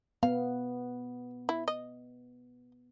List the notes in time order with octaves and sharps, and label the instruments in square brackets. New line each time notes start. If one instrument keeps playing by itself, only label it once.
[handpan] B3 [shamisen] F5
[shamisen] E4
D#5